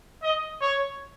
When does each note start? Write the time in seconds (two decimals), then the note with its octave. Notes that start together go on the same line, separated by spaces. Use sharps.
0.23 D#5
0.61 C#5